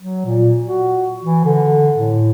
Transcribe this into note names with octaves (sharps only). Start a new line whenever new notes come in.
F#3
A#2
F#4
E3
D3
A2